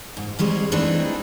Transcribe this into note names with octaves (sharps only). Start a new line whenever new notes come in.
G#2
F2 G3 G#3 C#5
E3 A3 C4 D4 D#4